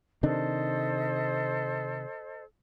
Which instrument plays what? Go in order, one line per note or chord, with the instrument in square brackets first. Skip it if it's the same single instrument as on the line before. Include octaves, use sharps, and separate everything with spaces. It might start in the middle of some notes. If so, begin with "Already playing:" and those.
[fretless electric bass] C3 D#3 D4 [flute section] A4 C5 D#5